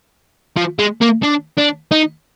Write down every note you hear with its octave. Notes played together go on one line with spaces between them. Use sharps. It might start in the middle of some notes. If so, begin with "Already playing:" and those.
F3
G#3
A#3
D4
D4
D#4